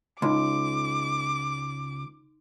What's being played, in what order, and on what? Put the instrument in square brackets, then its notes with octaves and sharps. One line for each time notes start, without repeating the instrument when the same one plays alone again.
[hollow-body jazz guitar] C#2 [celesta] D#4 C6 [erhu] D6